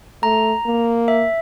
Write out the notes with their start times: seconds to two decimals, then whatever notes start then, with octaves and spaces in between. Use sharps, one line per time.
0.23 A3 A#5
0.66 A#3
1.08 E5